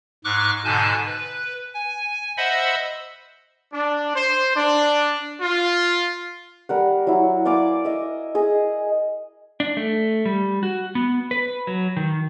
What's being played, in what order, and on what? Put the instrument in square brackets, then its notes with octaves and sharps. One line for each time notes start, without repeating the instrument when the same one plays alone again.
[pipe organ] G#2 C#6 D6 F6 F#6
G#2 B2 D3 G#5 A5 G6
B4
G#5
C5 D#5 E5 F#5 B5 E6
[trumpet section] D4
C5
D4
F4
[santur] G3 A#4 F#5
F#3 E4
D5 F5 G#5 D6
D#5 E5
G#4 D#5
[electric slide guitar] D4
A3
G3
F#4
B3
B4
F#3
D#3